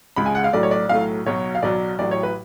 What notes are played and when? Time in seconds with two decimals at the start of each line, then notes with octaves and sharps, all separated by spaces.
0.16 C#2 C#3 G#3 B5
0.26 G#5
0.35 F#5
0.44 F5
0.53 B1 A2 F#3 A3 D5
0.63 C#5
0.71 D5
0.89 B1 A2 F#3 A3 F5
1.26 B1 B2 F#3 C#5
1.55 F5
1.62 B1 B2 F#3 D5
1.99 A1 A2 F#3 D5
2.11 C#5
2.23 B4